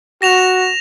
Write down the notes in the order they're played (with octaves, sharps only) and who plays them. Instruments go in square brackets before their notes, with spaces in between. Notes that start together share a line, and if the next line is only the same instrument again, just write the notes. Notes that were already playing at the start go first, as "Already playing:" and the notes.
[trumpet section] F#4 [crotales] A#6 E7 F7